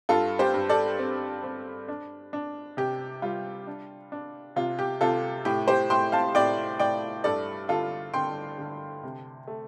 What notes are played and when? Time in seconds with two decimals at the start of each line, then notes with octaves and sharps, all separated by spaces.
0.09 G2 F4 A4
0.39 G4 C5
0.54 G2
0.69 A4 D5
0.99 C4
1.44 C4
1.88 D4
2.33 D4
2.77 C3 G4
3.22 G3 F4
3.67 D4
4.12 D4
4.56 C3 F4
4.79 G4
5.01 C3 F4 A4
5.45 A2 G4
5.68 G4 C5
5.90 A2 G5 C6
6.12 F5 A5
6.35 A2 D5 G5
6.79 A2 D5 G5
7.24 G2 A4 D5
7.69 D3 F4 A4
8.13 D3 G5 C6
8.58 D3
9.03 C3
9.47 A3